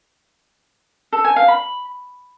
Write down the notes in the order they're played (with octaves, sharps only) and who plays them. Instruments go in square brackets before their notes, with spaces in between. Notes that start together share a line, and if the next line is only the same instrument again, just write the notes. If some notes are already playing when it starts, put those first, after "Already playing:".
[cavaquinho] A4
G#5
F5
B5